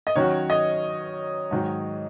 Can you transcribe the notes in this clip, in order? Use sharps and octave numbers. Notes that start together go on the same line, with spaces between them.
D#5
D#3 F#3 C#4 F#4 C#5
D#5
G#2 D#3 F#3